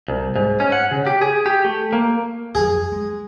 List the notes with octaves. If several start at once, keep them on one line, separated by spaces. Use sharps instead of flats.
C2
G#2
C#4
F#5
C#3
G4
G#4
G4
A3
A#3
F2 F#3 G#3 G#4
G#3